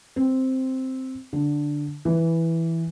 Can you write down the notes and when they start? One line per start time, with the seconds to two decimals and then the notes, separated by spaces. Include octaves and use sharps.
0.16 C4
1.33 D3
2.05 E3